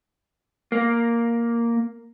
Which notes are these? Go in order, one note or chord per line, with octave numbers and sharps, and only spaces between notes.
A#3